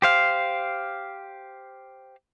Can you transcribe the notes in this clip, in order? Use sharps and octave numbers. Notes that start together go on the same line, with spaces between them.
G4 C5 F5